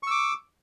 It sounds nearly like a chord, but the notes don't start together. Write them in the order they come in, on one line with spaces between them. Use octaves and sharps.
C#6 E6 D6